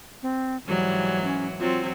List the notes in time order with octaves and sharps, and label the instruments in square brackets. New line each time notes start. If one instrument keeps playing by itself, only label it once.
[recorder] C4
[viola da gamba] G#2 E3 F#3 [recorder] G3
[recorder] C#4
[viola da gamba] F#3 C4 [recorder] F4